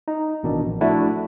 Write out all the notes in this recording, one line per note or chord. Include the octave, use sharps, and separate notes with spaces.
D#4
A1 B2 D#3 D4
A#1
F3 A3 D4 E4 F#4